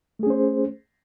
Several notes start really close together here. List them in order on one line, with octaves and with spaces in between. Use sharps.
A3 G#4 C#4 C5